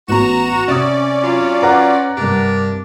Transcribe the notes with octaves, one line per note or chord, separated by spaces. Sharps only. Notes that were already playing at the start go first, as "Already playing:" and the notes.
A1 B3 F#4 A#5 E7
C3 C#4 D5 D#6
F#3 F4
B4 F#5 A#5 D6
G2 C3 D4 G4 A#4